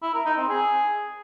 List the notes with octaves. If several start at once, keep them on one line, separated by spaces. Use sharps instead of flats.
E4
A#4
D#4
C4
G#4